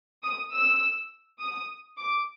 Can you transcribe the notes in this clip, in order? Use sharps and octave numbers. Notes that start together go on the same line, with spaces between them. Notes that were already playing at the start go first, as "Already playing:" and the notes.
D#6
E6
D#6
D6